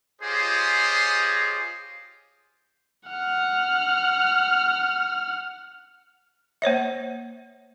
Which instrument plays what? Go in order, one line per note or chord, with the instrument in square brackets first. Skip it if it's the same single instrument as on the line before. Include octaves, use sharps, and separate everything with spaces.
[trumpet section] F4 G4 G#4 C5 C#5 D#5
[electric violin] F#5 F6
[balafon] A#3 C5 C#5 E5